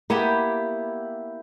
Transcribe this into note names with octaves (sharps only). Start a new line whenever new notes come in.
A#3 B3 E4 G4